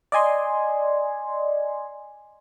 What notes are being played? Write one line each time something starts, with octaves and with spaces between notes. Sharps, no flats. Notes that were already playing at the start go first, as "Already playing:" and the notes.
D5 D#5 G#5 C6